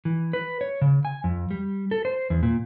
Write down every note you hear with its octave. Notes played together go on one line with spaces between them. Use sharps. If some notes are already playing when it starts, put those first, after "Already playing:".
E3
B4
C#5
C#3
G#5
F2
G3
A4
C5
E2
A#2